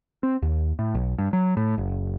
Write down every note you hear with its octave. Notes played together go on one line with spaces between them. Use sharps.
C4
D#2
A2
B1
G2
F#3
A2
F#1